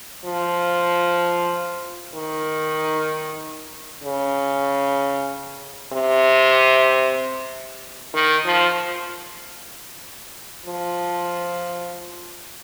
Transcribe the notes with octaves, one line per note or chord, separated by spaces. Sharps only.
F3
D#3
C#3
C3
D#3
F3
F3